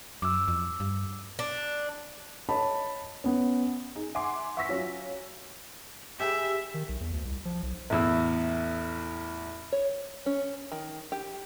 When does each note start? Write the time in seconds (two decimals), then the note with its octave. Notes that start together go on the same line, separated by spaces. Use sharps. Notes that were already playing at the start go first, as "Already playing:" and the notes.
0.22 F#2 D6 E6
0.48 F2
0.80 G2
1.39 D4
2.49 C#5 D#5 A5 B5
3.24 B3 C#4
3.96 D#4 G#4
4.15 E5 F#5 G#5 C6 D6 C7
4.57 E5 F#5 C#6 E6 A#6 B6
4.68 F#3 C#4 F4 F#4
6.20 G4 G#4 B4 E5
6.74 D#3
6.89 B1
7.00 E2
7.12 D2
7.25 C2
7.45 F3
7.63 B1
7.90 A1 E2 E6
9.72 C#5
10.26 C#4
10.72 D#3
11.12 G4